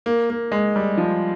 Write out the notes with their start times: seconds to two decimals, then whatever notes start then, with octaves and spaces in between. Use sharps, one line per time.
0.06 A#3
0.30 A#3
0.52 G#3
0.76 G3
0.97 F3